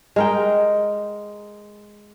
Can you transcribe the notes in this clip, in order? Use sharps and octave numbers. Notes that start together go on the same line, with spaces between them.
G#3 A#4 G5